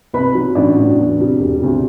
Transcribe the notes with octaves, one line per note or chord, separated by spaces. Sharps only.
C2 B4 B5
B2 F#3
A1 D4 D5
A2 F#3
E2
C3 G3
E1
D2 C3 G3